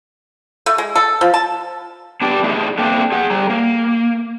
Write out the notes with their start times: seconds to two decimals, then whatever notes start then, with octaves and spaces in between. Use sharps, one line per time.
0.66 A3
0.78 G#3
0.96 A4
1.21 F3
1.34 A5
2.22 B3 D4 G4 D5
2.44 A3 E4 G#4 B4 D5 D#5
2.78 A3 A#3 C4 D4
3.12 G#4 F#5
3.30 G3 A#5
3.50 A#3